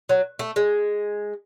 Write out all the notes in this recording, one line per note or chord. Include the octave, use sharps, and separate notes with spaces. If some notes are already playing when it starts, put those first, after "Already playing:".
F#3
A3
G#3